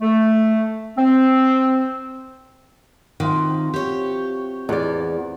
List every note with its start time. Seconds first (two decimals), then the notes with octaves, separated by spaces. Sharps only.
0.02 A3
0.97 C4
3.20 C3 D#3 F3 F#4
3.74 G4 C#5
4.69 E2 D5